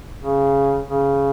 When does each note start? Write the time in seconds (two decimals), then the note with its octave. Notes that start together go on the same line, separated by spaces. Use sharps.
0.21 C#3
0.87 C#3